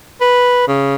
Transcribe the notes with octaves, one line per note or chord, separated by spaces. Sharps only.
B4
C#3